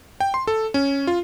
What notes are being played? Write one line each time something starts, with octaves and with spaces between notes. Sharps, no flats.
G5
C6
A4
C#4
F4